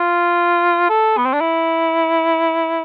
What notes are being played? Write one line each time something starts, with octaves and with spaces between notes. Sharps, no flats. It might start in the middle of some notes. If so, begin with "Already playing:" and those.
Already playing: F4
A4
B3
C4
D4
E4